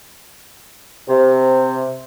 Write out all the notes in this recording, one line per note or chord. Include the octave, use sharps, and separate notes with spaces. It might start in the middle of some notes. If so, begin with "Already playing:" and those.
C3